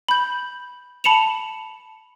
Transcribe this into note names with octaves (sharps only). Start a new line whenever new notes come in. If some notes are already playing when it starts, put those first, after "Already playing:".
B5 G6
A5 B5 C#7 E7 F7